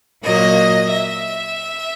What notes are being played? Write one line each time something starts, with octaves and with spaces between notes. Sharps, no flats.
A#2 F#3 A#3 D#5
E5